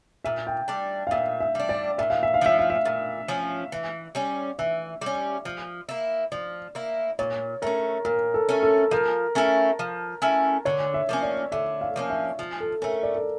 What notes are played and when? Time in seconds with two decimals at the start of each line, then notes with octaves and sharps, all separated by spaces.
0.25 A#2 E5
0.47 G5
0.68 G3 D4
1.07 F5
1.11 A#2 E5
1.40 E5
1.55 G3 D4
1.69 D5
1.98 A#2 E5
2.10 F5
2.23 E5
2.34 F5
2.41 F3 C#4 E5
2.59 F5
2.70 E5
2.85 A#2
3.28 F3 C#4
3.72 E3
4.15 G3 C#4
4.59 E3 E5
5.01 G3 C#4
5.45 F3
5.89 A#3 E4
6.32 F3 D5
6.75 A#3 E4
7.19 A#2 C#5
7.62 A3 C#4 A#4
8.05 A#2 A#4
8.34 A4
8.49 A3 C#4
8.63 A4
8.91 F3 A#4
9.35 A3 C#4 E4
9.79 F3
10.22 A3 C#4 E4
10.65 D3 C#5
10.94 E5
11.09 F3 A#3 C#4
11.23 D5
11.52 D3 E5
11.81 F5
11.96 F3 A#3 C#4
12.10 E5
12.39 F3
12.60 A4
12.82 A3 C#4 A#4
13.03 D5
13.15 A4